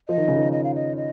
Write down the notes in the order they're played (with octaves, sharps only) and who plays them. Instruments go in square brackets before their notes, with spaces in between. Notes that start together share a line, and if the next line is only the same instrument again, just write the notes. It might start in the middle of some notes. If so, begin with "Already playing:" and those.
[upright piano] F3 [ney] D#5
[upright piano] D#3
C#3
D#3
[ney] D#5
F5
D#5
D#5